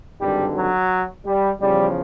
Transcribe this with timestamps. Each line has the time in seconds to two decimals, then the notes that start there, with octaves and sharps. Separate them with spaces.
0.21 G#1 G2 D3 G3
0.55 F#3
1.26 G3
1.60 E2 C#3 F3 G3